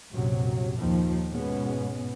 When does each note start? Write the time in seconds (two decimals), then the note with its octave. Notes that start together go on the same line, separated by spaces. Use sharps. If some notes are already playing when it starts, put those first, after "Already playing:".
0.11 A#1 F#2 C3 F#3
0.77 D#2 D#3 F3
1.31 G#2 B2 G#3 B3 C#4